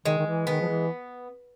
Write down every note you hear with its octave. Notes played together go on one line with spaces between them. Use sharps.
D#3 G#3
D#3
E3
D#3 B3
F3
E3